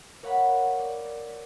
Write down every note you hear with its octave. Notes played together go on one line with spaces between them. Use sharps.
A#4 C#5 F5 F#5 B5
D5